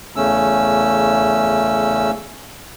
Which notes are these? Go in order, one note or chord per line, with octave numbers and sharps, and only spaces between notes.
E2 C#3 A3 C#4 E6